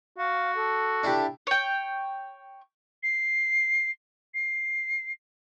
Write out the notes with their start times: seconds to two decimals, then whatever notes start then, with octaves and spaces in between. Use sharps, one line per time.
0.18 F#4 F5
0.56 A4
1.03 D4 E4 G4
1.47 C#5 G5
3.03 C7
4.34 C7